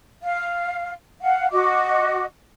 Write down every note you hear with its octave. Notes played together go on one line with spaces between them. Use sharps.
F5
F5 F#5
F#4 D#5 D6